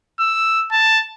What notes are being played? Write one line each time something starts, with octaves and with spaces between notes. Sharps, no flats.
E6
A5